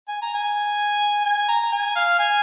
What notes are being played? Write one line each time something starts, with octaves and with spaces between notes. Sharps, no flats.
G#5
A#5
G#5
G#5
A#5
G#5
F5
G#5